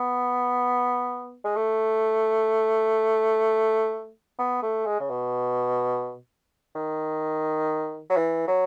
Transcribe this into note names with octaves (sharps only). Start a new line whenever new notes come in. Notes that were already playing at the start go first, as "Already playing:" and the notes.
Already playing: B3
G#3
A3
B3
A3
G#3
C#3
B2
D#3
F#3
E3
F#3